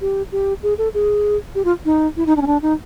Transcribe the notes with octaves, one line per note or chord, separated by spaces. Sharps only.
G4
G4
G#4
A4
G#4
G4
F4
D#4
E4
D#4
D4
C#4
D4
D#4